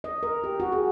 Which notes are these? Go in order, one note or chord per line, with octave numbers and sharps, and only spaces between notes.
D#5
A#4
G4
F#4
G#4